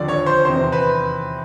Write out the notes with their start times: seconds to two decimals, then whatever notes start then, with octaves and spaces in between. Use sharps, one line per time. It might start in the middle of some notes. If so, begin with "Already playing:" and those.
Already playing: D#2 D3 F3 D5
0.08 C#5
0.26 C5
0.45 E2 C3 D#3 C5
0.72 B4